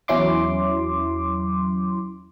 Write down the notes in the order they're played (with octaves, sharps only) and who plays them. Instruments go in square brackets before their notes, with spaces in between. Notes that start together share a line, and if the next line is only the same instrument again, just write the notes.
[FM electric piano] E2 F#3 C#4 E4 C6 D6